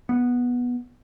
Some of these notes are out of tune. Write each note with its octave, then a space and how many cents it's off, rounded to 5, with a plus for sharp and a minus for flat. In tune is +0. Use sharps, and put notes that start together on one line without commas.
B3 -10